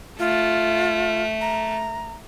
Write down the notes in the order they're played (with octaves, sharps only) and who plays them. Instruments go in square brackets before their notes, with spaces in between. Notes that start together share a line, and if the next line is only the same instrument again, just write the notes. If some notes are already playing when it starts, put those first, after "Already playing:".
[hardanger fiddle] A3 [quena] F4
[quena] A#5